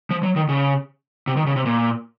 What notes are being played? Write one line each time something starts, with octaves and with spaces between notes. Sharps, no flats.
F3
F#3
D#3
C#3
C3
D#3
C#3
C3
A#2